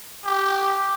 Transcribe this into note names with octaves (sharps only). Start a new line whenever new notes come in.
G4